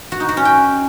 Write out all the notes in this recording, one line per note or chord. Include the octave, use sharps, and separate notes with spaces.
F#4
D#4
F#4
C#4
G5